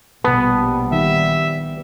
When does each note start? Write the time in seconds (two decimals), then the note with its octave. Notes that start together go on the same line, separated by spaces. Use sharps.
0.24 A#1 B2 G3 B3 A5
0.92 D#3 E5